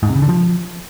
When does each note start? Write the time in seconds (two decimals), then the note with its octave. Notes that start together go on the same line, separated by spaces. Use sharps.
0.03 G#2
0.09 C3
0.16 C#3
0.22 D3
0.29 F3